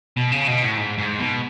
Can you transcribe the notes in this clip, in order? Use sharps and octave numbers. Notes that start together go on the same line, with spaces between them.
B2
C#3
B2
A2
G#2
G#2
B2